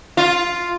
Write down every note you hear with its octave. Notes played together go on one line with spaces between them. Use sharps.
F4